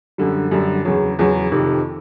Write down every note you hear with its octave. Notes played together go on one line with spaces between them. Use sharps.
F#2 D3 G3
F#2 D3 G3
E2 C#3 F#3
E2 C#3 F#3
F2 C3 D#3